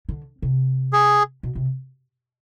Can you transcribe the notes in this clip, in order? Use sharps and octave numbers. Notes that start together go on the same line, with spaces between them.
D3
C3
G#4
B2
C3